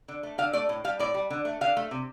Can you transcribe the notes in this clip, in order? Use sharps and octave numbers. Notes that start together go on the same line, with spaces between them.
D3
A3
D3 F5
A3 D5
A2
G3 F5
A2 D5
G3
D3
A3
D3 F5
A3
C3